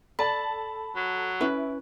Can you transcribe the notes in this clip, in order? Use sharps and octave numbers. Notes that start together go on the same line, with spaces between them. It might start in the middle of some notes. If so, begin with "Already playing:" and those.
A4 D5 A5 B5
F#3
C#4 E4 B4